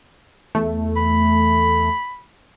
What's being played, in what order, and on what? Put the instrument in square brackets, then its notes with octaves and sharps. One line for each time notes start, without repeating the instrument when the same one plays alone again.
[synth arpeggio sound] E2 A3
[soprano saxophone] B5